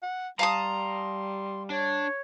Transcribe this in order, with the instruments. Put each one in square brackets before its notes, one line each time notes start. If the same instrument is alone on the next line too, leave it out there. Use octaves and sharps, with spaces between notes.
[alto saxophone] F#5
[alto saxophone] G3 [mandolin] F5 A5 D#6 [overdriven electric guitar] A#5 [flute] C6
[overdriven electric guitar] D4 [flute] C#5